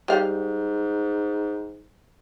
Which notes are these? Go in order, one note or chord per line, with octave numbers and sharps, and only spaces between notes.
G#2 G3 F5